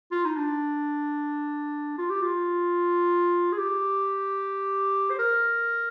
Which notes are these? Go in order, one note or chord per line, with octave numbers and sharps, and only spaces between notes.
F4
D#4
D4
F4
G4
F4
G#4
G4
C5
A#4